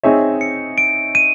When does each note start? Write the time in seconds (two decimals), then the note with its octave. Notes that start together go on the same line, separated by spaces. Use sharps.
0.03 C4 D#4 G#4 C#5 E5
0.41 C#7
0.78 D7
1.15 D#7